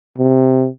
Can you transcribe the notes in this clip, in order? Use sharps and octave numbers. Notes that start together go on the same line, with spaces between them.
C3